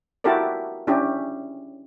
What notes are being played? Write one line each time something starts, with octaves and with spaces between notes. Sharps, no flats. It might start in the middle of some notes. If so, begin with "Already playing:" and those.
E4 F#4 G4 A4 A#4 D5
C#4 D4 E4 G4